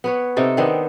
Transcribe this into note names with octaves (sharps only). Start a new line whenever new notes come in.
B3 B4 C#5
C3 D#4 A4
D#3 B3 C4 D4